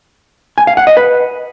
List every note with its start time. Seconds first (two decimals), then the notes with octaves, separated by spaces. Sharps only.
0.58 G#5
0.67 F5
0.77 F#5
0.87 D#5
0.97 B4